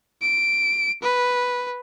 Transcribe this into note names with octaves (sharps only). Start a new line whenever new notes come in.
D7
B4